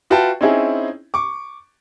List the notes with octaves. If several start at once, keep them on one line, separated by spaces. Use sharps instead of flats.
F4 F#4 B4 E5 G5 A5
C4 C#4 D#4 E4 G#4
C#6 D6